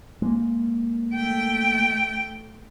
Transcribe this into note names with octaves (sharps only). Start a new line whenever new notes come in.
G#3 A#3
A3 G5